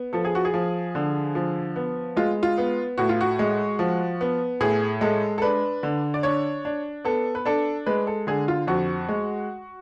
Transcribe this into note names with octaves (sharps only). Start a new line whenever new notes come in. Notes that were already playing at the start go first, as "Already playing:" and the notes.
Already playing: B3
F3 A4
G#4
F#4
G#4
F3
D3
F3
B3
G#3 F4
F4
B3
A2 F#4
F4
F#4
G#3
F3
B3
A2 G#4
G#3 A4
A4
D4 B4
D3
D5
D4 C#5
D4
B3 A4
B4
D4 A4
G#3 B4
A4
D3 G#4
F4
F2 F#4
G#3